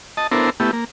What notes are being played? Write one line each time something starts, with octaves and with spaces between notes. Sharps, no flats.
D#5 A5
B3 D4 E4 A4 A#4 C5
A3 B3 E4 G4
A#3